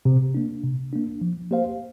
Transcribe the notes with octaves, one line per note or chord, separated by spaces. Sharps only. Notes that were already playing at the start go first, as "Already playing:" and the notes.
C3
A#3 D4
C3
A#3 D4
F3
A#3 G4 C5 F5